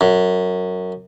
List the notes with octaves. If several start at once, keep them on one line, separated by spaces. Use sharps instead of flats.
F#2